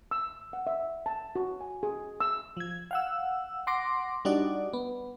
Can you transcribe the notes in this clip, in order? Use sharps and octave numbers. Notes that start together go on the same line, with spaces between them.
E6
F#5
E5
A5
F#4
G#5
G#4
E6
F3 G#6
F5 F#5 E6
F#5 C6 D6 A#6
G3 D4 D#4 F#4 D5
B3